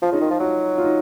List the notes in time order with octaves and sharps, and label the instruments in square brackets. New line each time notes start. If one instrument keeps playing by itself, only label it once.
[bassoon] F3 [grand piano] F4
[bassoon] C#3 [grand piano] D#4
[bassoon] D#3 [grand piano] F4
[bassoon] F3
[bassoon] F#3 [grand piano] F#4
[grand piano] F4
D#4